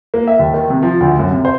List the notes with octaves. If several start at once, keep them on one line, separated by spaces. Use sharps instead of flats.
A#3
E5
D#2
D#3
C3
F3
D2
F#2
C3
C5